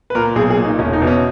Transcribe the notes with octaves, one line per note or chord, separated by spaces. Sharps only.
B4
A#2 A#4
B1 G#4
G#4
A#2
D#4
E1 C#4
D#4
E2 B2
C#4